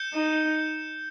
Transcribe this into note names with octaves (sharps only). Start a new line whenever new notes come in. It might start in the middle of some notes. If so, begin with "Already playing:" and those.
Already playing: G6 C#7 E7 G7
D#4